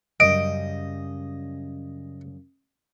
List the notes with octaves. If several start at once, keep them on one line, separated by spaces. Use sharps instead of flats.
F#2 C#3 G3 D#5 D7